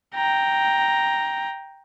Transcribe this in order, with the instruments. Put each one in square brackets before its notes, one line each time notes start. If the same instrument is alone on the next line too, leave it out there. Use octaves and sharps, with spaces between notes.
[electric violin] G5 A#5